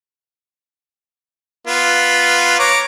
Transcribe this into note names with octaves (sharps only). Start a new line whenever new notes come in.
B3 F4
C#5 A#5 D6